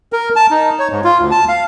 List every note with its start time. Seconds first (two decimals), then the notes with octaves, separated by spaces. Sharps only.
0.13 A#4
0.36 A5
0.51 D#4
0.79 C#5
0.92 G#2
1.04 F4
1.19 D2
1.31 A5
1.48 F5